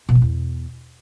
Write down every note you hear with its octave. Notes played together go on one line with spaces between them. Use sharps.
B2
F3
E2